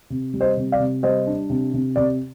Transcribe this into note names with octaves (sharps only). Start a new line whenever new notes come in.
C3
G3
C5 D#5
C3
D5 F5
C3
G3 C5 D#5
D4
C3
C3
C3 D5